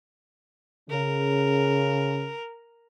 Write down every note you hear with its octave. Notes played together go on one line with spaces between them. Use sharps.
C#3 A#4